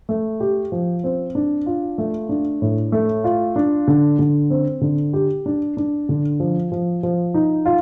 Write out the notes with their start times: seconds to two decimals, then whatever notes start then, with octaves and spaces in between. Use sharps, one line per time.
0.09 A3
0.40 G4
0.72 F3
1.04 C4
1.35 D4
1.66 F4
1.98 A3
2.29 D4
2.62 A2
2.92 A3
3.24 F4
3.56 D4
3.88 D3
4.19 D3
4.50 C4
4.81 D3
5.13 G4
5.46 D4
5.77 D4
6.09 D3
6.40 F3
6.72 F3
7.03 F3
7.34 D#4
7.66 F4